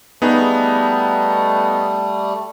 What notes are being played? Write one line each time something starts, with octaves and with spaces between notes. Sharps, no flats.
G3 A3 B3 D#4 G#4